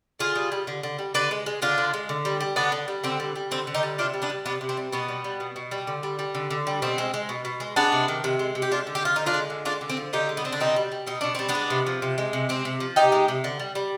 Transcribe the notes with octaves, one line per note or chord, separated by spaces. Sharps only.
D3 F4 G#4
G3
G3
D3
D3
G3
D3 B4 D5
G#3
G#3
D3 D4 F4
D3
G#3
D3
G3
G3
D3 B3 D4
D3
G3
D3 C4
G3
G3
D3 C4
D3
D#4 G4
G3
C3 D4 F4
G3
B3 D4
G3
C3 B3 D4
C3
C4
G3
B2 B3
G3
G3
B2
B2
G3
D3
G3
G3
D3
D3
G3
B2 C4
G#3
G#3
B2
B2
G#3
G#3 B3 D4
C3
D#3
C3
G#3
C3
G4
G#3 D4 F4
D3
G4
F3 F4
D3 D#4
D4 F4
G#3
D3
G#3 D4 F4
D3
C4
F3
D3 D#4 G4
G#3
B3
D3 C4
D4
B2 C4 D#4
G3
G3
B2 D#4
B2 D4
G3 C4
B3 D4
G#3
C3
F3
C3
G#3
C3
G#3 C4
C3
F3
C3 D#4 G4
G#3
C3
D3
G3
G3